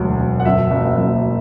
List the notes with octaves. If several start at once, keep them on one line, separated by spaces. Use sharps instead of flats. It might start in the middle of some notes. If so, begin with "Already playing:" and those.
Already playing: E1 D2 F#3
E1
F#5
F#2 E5
F#1
F#1